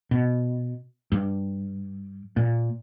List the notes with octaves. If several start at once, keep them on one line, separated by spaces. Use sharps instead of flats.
B2
G2
A#2